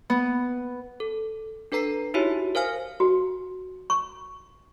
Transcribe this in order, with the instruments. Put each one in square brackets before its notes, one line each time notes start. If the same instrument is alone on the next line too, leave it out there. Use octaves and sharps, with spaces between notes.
[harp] B3
[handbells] A4
D4 A4 B4 A#5 C7
D#4 E4 F#4 G4 C#5 E5
A#4 C5 F5 G#5 F6
[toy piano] F#4
C#6